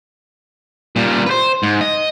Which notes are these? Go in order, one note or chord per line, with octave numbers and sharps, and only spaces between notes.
A#2 G3
B4 C5
G#2
D#5